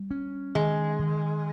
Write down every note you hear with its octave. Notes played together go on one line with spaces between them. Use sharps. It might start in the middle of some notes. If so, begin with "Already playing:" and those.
Already playing: G3
C#4
D#3 G#3
D#3